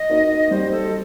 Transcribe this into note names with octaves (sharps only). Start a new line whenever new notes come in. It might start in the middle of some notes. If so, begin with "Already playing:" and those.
Already playing: D#5
A#3 D#4 F#4
G3 C5
A4